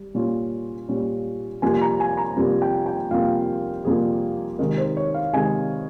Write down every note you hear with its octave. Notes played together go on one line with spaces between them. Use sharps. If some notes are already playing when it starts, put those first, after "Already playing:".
Already playing: G3
A#2 G3 C#4 F4
A#2 G3 C#4 F4
F2 C3 G3 A#3 F4 G#5
A#5
G#5
A#5
F2 C3 G3 A#3 F4
G5
G5
F2 C3 G3 A#3 F4 F5
F2 C3 G3 A#3 F4 G#4
C3 D#3 G#3 D#4 A#4
C5
C#5
F5
C3 D#3 G#3 D#4 G#5